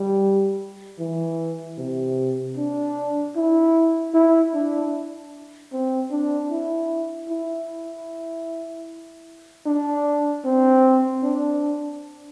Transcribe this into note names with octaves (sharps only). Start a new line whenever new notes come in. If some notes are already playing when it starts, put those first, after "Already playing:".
Already playing: G3
E3
C3
D4
E4
E4
D4
C4
D4
E4
E4
D4
C4
D4